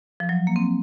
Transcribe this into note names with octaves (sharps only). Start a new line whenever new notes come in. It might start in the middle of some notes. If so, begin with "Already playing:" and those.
F3
F#3
A#3
C4